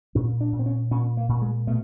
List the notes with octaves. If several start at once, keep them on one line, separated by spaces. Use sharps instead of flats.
A#2 C#4
D4
A#2
C4
C#4
A#2 C#4
A#3
A#2
G#3
B2 A3